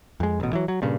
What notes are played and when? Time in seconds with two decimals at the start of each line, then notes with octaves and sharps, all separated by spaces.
0.20 F2 G#3
0.40 A1 B2
0.53 E3 F#3
0.68 F#3
0.82 G2 A#2 C#3